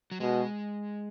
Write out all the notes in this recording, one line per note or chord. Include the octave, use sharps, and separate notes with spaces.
F#3
B2 G#3